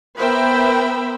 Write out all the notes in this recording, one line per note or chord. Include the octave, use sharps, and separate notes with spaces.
B3 A#4 C5 E5 G5 B5